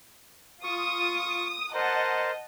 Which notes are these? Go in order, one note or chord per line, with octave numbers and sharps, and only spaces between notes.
F4 C#6 D#6
A#4 C5 D#5 F#5 A5